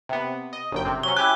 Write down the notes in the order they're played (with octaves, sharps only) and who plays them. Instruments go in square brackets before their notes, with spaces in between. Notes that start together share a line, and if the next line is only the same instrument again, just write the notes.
[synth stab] C3 B3
D#5
G1 F#2 G5
C3 C4
[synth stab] F#3 C#4 [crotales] G7
[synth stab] E4 G4 G#5 [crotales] F#6